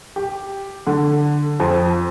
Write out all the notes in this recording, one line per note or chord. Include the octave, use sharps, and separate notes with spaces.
G4
D3
F2